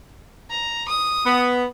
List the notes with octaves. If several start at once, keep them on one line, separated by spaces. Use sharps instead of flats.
A#5
D#6
B3